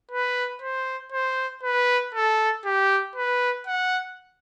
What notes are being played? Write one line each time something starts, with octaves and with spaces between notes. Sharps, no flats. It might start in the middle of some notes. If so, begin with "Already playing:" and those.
B4
C5
C5
B4
A4
G4
B4
F#5